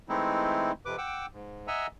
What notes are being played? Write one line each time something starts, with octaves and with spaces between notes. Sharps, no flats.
E3 G#3 A3 C4 D#4 E4
F2 C3 B4 D6
F#5 G5 D6 E6
G#2
D#5 E5 F#5 G#5 A#5 E6